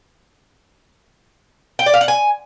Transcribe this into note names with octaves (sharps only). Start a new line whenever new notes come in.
G5
D5
F5
F#5
G#5